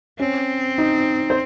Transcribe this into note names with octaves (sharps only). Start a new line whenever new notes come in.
C4 C#4
D#4
C5